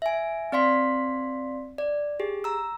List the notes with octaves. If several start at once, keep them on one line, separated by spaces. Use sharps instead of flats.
E5 G#5
C4 D5 F5 C6 B6
D5
G4 G#4
A#5 E6